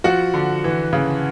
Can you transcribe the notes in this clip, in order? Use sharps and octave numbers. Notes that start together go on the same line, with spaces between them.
F3 F#4 F#5
D3
E3
C#3